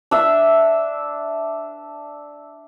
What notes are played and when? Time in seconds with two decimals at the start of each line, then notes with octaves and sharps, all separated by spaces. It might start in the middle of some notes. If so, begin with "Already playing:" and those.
0.11 D4 E5